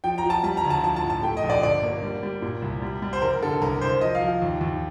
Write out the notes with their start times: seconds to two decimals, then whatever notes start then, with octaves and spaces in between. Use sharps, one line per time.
0.04 F3 G5
0.18 A#5
0.24 F3
0.30 A5
0.43 G3 A5
0.57 A#5
0.63 D2
0.70 A5
0.84 F3 A5
0.96 A5
1.03 A2
1.10 A5
1.23 A3 G5
1.37 D#5
1.44 A#1
1.50 D5
1.62 G1 D5
1.83 A#3
2.03 G3
2.23 G3
2.42 A#2
2.62 C2
2.82 G3
3.02 G3
3.13 C5
3.21 F1 A#4
3.42 D3 A4
3.61 C2 A#4
3.81 C2 C5
4.01 F3 D#5
4.15 F5
4.22 F3
4.42 D#2
4.61 D#2